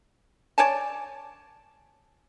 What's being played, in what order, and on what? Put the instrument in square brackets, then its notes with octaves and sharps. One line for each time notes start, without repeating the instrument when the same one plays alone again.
[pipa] C#5 D5 G#5 A5